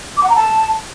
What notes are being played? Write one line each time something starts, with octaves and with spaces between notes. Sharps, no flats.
D6
F#5
A#5
A5